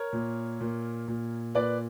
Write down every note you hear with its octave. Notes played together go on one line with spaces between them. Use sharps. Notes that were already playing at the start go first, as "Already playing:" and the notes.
Already playing: A#4 C#5
A#2
A#2
A#2
A#2 B4 D5